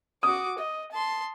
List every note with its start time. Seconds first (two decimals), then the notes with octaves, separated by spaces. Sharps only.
0.23 F#4 D6 D#6
0.58 D#5
0.91 A5 C6